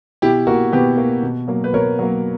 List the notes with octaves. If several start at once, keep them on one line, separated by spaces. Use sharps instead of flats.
B2 E4 G4
A#3 F#4 A#4
B2 G4 B4
A#3
B2
F#3 A#3
B4
B2 A#4 C#5
F#3 A#3